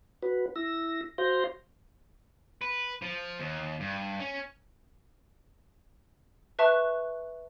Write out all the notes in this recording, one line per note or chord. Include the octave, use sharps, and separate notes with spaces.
F#4 B4
E4 E6 A#6
F#4 C5 F5 C6 G6 A#6
B4
F3
D#2
G2
C#4
B4 E5 A5 C#6 F#6